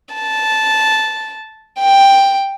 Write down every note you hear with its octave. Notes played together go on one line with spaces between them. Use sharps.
A5
G5